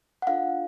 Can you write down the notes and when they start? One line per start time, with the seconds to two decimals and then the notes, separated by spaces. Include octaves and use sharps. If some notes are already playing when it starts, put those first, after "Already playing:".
0.22 F#5
0.27 D4 F4 A4 F5